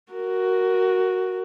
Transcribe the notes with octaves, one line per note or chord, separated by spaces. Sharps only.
F#4 A#4